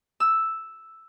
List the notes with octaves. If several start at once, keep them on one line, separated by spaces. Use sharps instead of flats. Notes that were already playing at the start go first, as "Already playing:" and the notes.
E6